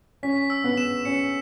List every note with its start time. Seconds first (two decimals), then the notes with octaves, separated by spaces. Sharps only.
0.23 C#4 B6
0.50 E6
0.64 B3
0.77 E7
1.05 C#4 C#7